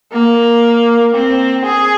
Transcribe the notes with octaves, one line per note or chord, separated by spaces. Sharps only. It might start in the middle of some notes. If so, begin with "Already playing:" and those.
A#3
C4
G#4